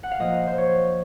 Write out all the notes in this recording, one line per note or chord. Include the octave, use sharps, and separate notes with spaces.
F#5
F5
A#2 F3 A#3 D#5
C5
C#5